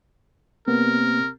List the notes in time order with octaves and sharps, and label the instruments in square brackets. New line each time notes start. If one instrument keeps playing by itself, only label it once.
[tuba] C3 [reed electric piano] A#3 B3 [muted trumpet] A#4